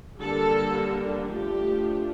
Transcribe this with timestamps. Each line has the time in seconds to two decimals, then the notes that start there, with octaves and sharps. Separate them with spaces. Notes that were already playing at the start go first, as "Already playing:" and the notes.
0.19 D3 G3 A#3 A4
1.32 F3 A3 D4 G4